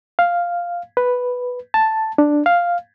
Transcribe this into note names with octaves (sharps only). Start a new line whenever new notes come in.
F5
B4
A5
D4
F5